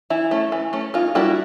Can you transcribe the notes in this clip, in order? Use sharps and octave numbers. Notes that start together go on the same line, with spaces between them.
E3 E4
A3 C#4
E3
A3 C#4
E3 D#4 F4
G3 A#3 D4 E4 F#4